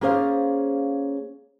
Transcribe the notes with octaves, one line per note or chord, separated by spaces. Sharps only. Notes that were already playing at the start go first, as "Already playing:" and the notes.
A#3 C#4 G#4 C5 D5 F5